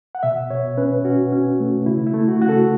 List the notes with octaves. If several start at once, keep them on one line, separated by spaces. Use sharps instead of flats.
F#5
B2 E5
B2 C#5
C#4 B4
C#4 F#4
C#4
A3
C#3 E4
E4
A3
F#4
C#3 F#4
A4